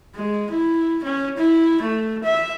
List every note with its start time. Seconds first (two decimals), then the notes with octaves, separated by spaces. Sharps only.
0.15 G#3
0.51 E4
1.04 C#4
1.37 E4
1.82 A3
2.24 E5